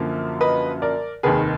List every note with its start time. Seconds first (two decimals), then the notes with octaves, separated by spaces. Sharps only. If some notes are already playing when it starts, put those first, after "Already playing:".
Already playing: F#2 D3 F3 A#3
0.41 B4 D#5
0.82 A#4 D5
1.23 F1 D#2 D#3 G#4 B4